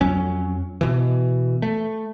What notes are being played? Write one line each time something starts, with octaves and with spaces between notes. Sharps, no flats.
F2 F#3 C#4
B2 E3
A3